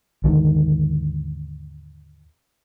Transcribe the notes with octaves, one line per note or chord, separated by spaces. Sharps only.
D#2 G#2 D3 D#3